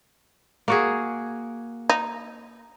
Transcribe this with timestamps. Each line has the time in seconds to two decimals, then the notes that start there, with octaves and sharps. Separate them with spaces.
0.68 A#3 F#4 G#4
1.89 D#4